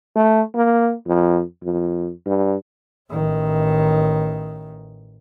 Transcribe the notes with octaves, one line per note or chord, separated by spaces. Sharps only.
A3
A#3
F2
F2
G2
A1 D#3